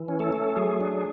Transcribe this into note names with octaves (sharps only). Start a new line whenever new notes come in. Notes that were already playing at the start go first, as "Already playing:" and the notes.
Already playing: E3
C#4
A3 A4
A3
F#3 G#4
D4